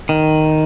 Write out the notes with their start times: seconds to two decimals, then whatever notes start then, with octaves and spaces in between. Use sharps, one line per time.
0.09 D#3